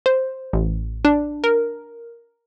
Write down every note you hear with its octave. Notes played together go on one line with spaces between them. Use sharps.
C5
A1
D4
A#4